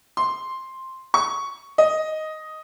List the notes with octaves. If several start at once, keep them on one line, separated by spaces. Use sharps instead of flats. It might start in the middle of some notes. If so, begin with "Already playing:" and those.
C6
C#6
D#5